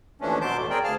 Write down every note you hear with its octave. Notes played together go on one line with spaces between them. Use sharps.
D#2 E3 F3 A3 C#4 D4
B2 F#3 A5 C6 D6 G6
E2 A2 A3
C4 G#4 A#4 D5 G5
D2 G#4 F5 A5 F6